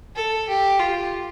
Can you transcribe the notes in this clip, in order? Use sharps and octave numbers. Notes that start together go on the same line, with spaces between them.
A4
G4
F4